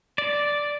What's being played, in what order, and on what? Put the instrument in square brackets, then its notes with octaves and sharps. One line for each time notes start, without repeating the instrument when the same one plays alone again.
[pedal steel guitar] D5